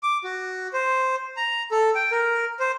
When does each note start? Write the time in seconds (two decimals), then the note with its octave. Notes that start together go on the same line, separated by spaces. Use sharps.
0.03 D6
0.24 F#4
0.73 C5
1.37 A#5
1.71 A4
1.95 G5
2.11 A#4
2.59 C5